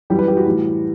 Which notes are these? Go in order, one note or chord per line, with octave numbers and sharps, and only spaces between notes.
F#2 E3 G3 G4
B4
G4
F#4
A2 E3 G3